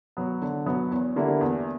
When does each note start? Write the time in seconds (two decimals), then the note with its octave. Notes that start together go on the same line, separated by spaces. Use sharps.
0.17 F#3 B3
0.42 D3
0.66 F#3 B3
0.91 E2
1.16 D3 G3 A#3 E4
1.41 E2